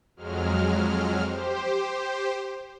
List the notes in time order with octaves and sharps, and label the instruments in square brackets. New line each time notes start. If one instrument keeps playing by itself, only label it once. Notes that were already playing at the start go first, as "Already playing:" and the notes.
[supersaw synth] F2 F#3 G#3 F6
G4 C5